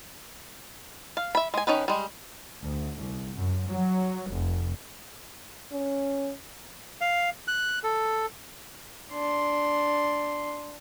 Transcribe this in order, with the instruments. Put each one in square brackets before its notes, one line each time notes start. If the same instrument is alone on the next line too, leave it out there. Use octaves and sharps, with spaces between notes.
[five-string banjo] F5
E5 B5
G#3 G#5
D#3 C#4 D#4 B4
G3 G#3
[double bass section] D2
C2
F#2
F#3
F1
[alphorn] C#4
[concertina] F5
F#6
A4
[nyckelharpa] D4 C6